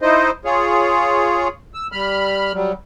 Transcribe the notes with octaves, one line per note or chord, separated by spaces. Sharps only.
D#4 E4 C5 D#5
F4 G#4 C#5
E6
G3 B5 F6
F#3 G3